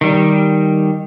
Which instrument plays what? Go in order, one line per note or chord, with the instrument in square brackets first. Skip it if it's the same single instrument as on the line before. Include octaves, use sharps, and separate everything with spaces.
[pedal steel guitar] D#3 G3